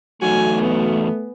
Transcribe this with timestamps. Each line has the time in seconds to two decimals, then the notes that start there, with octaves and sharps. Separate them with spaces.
0.22 E2 F#3 A3 D#4 F#4 G#5
0.61 B3